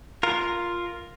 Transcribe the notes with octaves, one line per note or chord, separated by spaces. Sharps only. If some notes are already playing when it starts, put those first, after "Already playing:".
F4 A#4